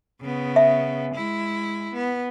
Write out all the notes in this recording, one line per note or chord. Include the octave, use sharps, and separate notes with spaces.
C#3 B3
E5
G#3 E4
B3